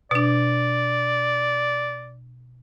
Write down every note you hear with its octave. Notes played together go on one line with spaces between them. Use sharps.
B2 D4 D5